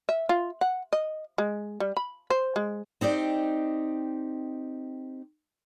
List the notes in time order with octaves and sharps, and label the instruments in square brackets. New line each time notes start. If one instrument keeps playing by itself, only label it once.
[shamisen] E5
F4
F#5
D#5
G#3
G3
B5
C5
G#3
[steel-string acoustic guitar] C4 D#4 G4 D5